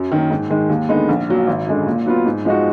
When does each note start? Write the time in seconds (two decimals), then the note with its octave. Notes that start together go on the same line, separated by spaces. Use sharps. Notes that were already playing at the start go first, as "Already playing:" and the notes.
Already playing: F#2
0.12 D#3 F#3 A#3
0.31 G#2
0.50 D#3 G#3
0.69 D#2
0.89 D3 G#3 B3 D#4
1.09 A#1
1.28 A#2 F#3
1.47 G#1
1.67 F#2 D3 G#3
1.86 A#2
2.06 F#3 B3 F4
2.26 G#2
2.45 F3 G#3 D#4 F#4